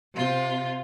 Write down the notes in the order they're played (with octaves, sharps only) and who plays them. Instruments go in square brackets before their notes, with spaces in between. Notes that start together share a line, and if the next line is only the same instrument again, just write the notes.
[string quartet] C3 F4